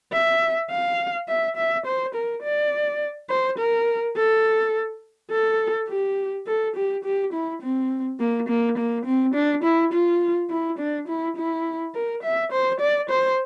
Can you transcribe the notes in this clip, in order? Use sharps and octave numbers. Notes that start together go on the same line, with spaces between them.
E5
F5
E5
E5
C5
A#4
D5
C5
A#4
A4
A4
G4
A4
G4
G4
E4
C4
A#3
A#3
A#3
C4
D4
E4
F4
E4
D4
E4
E4
A#4
E5
C5
D5
C5